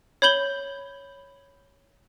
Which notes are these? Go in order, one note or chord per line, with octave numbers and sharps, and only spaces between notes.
C#5 B5 G6 F#7 G7